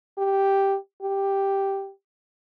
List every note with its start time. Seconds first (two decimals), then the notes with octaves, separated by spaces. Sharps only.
0.18 G4
1.02 G4